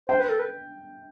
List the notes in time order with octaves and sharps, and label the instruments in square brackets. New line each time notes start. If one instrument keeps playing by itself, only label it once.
[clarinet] C5 [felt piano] G5
[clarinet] B4
A4
B4